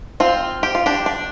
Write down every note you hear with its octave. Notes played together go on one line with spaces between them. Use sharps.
C4 F4
G4
F4
D4 G4
D4